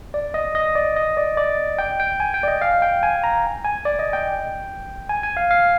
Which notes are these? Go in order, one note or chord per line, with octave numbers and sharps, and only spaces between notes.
D5
D#5
D#5
D5
D#5
D5
D5
G5
G5
G#5
G5
D5
D#5
F5
G5
G#5
A#5
G#5
D5
D#5
G5
G#5
G#5
F5
F5